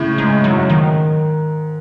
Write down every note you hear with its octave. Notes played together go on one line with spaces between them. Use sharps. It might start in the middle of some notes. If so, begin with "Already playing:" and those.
Already playing: A2 C#3
G#2 G#3
G#2
A2 F#3
F#2
G#2
D#3